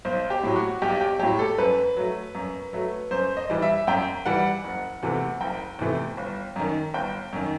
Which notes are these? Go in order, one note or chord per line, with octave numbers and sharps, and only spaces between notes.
B1 C5
G4
A2 F#3
F#4
B1 G4
G4
A2 F#3 G4
A4
F#2 B4
F#3 A3
F#2
F#3 A3
F#2 C5
D#5
E3 G3
E5
F#2 G5
E3 G3 F#5
F#1
E2 C3 E3 A3
F#1 G5
E2 C3 E3 A3
G1
F#2 D#3
G1 G5
F#2 D#3